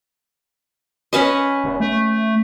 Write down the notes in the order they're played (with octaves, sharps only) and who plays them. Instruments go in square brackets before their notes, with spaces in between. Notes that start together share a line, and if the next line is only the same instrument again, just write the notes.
[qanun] C#4 B4 D#5
[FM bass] F1
A3